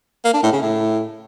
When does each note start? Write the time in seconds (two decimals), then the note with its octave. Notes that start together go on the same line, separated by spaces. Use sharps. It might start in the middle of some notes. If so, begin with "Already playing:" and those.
0.24 A#3
0.34 D4
0.43 A2
0.52 C#3
0.62 A2